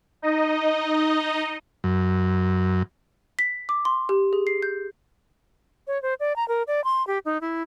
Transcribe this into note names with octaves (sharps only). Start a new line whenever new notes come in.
D#4 D#5
F#2
B6
D6
C6
G4
G#4
C7
G6
C#5
C5
D5
A#5
A#4
D5
C6
G4
D#4
E4